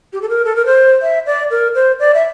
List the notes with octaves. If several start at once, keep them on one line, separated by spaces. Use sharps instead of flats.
G4
A4
A#4
A4
A#4
C5
E5
D5
A#4
C5
D5
E5